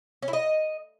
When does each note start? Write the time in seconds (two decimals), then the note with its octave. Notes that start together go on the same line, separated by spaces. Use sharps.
0.22 C#4
0.28 E4
0.33 D#5